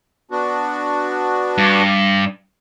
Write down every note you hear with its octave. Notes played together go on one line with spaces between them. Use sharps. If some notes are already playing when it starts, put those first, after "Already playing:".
B3 D4 F#4
G2